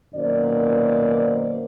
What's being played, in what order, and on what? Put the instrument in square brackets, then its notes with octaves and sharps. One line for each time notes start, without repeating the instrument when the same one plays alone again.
[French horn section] F#2 B2 D#3 A#3 C5 D5